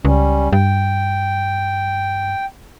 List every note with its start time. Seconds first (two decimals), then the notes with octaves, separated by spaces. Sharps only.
0.05 C#2 G3 C#4
0.53 G2 G5